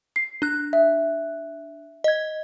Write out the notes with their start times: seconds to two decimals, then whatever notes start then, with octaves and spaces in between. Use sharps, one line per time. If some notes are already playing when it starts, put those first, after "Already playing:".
0.16 C7
0.42 D4 F#6
0.73 E5
2.04 D#5 G#6